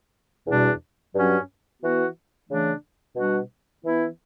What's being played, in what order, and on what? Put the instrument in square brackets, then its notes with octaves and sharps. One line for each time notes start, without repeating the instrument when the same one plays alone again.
[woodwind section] E2 B2 G3 D4 F#4
G2 F#3 C#4 F#4
E3 B3 F#4
C#3 E3 A3 D4
B2 G3 D4 F#4
E3 B3 E4